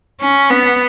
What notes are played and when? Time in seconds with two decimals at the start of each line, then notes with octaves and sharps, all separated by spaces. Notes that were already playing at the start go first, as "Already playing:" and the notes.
0.21 C#4
0.50 B3